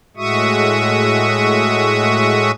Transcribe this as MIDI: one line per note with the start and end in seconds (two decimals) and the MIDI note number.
0.17 2.51 45
0.17 2.51 56
0.17 2.51 66
0.17 2.51 76
0.17 2.51 85
0.17 2.51 87